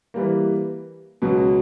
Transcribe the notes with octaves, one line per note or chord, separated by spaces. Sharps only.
E3 G3 A#3
C#2 B2 F#3